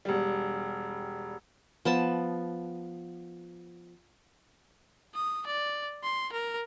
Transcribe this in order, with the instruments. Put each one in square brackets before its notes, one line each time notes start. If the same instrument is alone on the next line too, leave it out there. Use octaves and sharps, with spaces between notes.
[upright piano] E1 G3
[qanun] F3 B3 A5
[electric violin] D#6
D5
C6
A#4